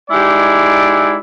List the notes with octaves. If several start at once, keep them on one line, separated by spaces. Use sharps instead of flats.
G#3 D#4 E4 G4 D5